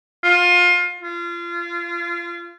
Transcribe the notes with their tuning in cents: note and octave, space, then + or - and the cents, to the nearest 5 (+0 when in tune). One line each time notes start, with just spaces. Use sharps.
F4 +25
F4 -30